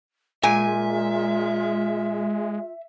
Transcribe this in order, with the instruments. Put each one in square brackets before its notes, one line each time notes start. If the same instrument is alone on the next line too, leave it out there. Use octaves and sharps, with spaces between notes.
[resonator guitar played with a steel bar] A#2 G#5 [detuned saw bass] G#3 [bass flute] F4 [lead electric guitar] E5